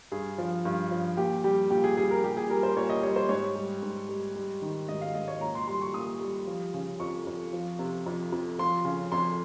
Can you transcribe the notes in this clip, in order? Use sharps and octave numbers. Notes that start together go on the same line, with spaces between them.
G2 G#4
F3
G2
F3
A#2 G4
G3 G4
A#2 G4
G#4
G3 G#4
A#4
A#2 G4
G#4
G3 A#4
C5
A#2 C#5
D#5
G3 C#5
C5
G#2 C#5
G3
G#2
G3
G3
D#3
G#2 D#5
F5
G#2 D#5
C#5
A#2 A#5
C6
G3 C6
C#6
A#2 D#6
G3
F3
C#3
F2 C#6
F2
F3
C3
F2
F2
F3 C6
C#3
F2 C6